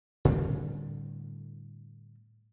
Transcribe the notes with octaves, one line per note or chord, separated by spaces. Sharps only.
A2 D3 G3 C4